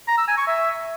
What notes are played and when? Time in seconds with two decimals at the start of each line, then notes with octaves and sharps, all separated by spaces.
0.08 A#5
0.18 E6
0.28 G#5
0.37 C#6
0.47 E5